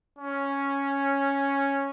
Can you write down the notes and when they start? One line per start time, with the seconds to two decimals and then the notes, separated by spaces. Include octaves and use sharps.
0.18 C#4